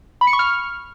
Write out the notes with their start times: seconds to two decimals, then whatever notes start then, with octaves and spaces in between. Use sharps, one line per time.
0.21 B5
0.27 C#7
0.33 C#6
0.39 F6